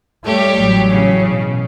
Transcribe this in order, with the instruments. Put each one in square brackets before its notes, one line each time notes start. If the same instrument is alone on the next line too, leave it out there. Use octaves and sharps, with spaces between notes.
[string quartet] G3 G4 C#5 [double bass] A3
[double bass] A1 F#3
[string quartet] C#3
[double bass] B2